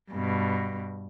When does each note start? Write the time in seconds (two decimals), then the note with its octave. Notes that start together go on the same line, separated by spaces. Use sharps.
0.12 G2 B2